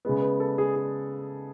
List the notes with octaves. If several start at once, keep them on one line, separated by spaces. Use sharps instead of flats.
C#3 G#3 B3
B4
A4
G#4
G#4